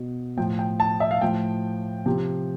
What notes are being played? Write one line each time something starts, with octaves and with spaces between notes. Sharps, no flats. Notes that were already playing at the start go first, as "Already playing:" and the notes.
Already playing: B2
A2 F3 G5
G5
A5
E5
F5
A2 F3 G5
C3 F3 G5